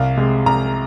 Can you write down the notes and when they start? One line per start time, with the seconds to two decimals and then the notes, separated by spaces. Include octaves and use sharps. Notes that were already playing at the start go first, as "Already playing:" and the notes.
Already playing: C2 F5
0.17 C3 G#3
0.46 C2 A#5